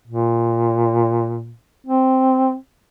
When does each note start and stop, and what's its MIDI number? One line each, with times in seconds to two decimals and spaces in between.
0.07 1.55 46
1.86 2.55 60